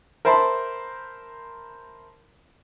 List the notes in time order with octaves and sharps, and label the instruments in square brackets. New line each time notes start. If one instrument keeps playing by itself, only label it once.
[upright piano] A#4 C5 E5 A5 B5 C6